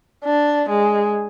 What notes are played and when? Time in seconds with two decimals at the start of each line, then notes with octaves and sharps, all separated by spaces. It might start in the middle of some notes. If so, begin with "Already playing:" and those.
0.24 D4
0.69 G#3